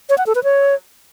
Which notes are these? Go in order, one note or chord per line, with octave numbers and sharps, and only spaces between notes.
C#5
F#5
A4
B4
C#5